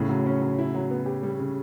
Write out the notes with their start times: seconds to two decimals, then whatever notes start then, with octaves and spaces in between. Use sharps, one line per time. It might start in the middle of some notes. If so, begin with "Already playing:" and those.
Already playing: A2 C#3
0.09 F#3
0.26 C#4
0.41 F#3
0.59 E4
0.74 F#3
0.91 B3
1.06 G4
1.23 G3
1.39 C#3